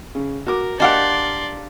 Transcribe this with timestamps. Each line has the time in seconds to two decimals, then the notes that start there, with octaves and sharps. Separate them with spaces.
0.15 C#3
0.47 F#4 A#4 D6
0.80 D4 G4 A#4 D5 D#5 F5 F#5 C6